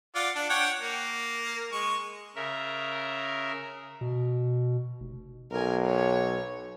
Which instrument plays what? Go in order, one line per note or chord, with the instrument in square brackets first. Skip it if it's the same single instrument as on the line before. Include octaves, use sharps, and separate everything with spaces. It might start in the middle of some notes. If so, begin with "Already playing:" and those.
[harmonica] F4 D5 F#5
D4
C#5 F#5 G5
A#3
G#3 C#6
[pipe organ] C#3 A#4 E5
[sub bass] B2
F1
[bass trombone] B1 [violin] A#4 G#5
[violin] C#5